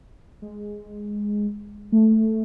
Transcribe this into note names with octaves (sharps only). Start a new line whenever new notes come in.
G#3
A3